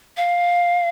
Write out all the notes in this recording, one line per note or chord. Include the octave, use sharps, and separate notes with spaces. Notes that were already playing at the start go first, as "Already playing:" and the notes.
F5